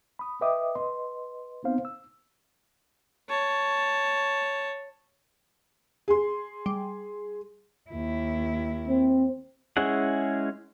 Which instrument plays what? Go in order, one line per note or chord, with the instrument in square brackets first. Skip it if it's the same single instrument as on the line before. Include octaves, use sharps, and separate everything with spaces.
[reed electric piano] B5 D#6
B4 D#5 E5 G5 D6 D#6
B4 D#5 C6
B3 C4 D#4 C5 F5
E6
[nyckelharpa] C#5 A5
[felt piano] G#4 C6
[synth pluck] G3
[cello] D#2 E4
[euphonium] C4
[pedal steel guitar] G#3 C#4 E4 G#4 F#5